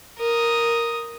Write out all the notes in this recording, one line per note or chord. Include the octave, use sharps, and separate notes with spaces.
A#4 D#6